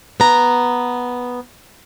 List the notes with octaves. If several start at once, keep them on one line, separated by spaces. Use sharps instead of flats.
B3 A#5